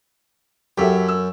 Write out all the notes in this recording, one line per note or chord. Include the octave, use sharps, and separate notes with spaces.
F#2 G4 A4 E5
E6